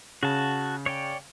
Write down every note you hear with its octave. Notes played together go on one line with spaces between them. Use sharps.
C#3 F#4 A5
C#5 D5 G5